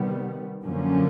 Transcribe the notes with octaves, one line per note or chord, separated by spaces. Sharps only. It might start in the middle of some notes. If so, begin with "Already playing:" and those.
Already playing: C3 D#3 G3 B3
F#2 D3 F3 A#3 C#4